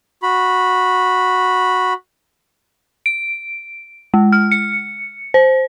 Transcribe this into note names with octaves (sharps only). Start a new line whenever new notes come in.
F#4 B5
D7
G#3
F6
C#7
C5